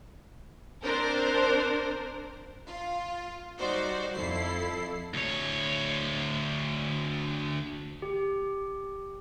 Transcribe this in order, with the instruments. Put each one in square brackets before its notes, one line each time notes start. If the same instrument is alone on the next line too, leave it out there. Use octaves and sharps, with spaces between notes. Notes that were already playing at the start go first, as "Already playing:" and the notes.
[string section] C4 D4 A#4 C5
F4
G3 D#4 F#4 C5 D5
F2 E4 A4 C7
[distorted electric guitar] D2 C#5
[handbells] G4